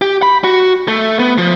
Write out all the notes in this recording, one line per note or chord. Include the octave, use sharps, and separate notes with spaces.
G4
B5
F#4
A3
B3
F3